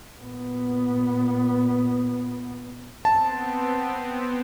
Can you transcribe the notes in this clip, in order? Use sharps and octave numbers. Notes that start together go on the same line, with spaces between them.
A#2 B3
B3 C4 A5